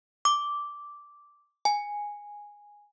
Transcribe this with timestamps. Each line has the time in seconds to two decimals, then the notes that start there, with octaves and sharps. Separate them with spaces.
0.25 D6
1.65 G#5